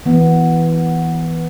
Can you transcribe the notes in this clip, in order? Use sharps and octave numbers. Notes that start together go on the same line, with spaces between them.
E3 B3